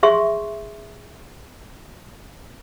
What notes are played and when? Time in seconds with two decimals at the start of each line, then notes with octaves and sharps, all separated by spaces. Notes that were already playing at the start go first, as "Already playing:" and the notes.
0.03 G#4 E5 C6 C#6